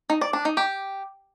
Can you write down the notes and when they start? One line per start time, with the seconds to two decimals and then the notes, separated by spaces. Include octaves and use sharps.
0.10 D#4
0.21 D5
0.33 D4
0.45 D#4
0.57 G4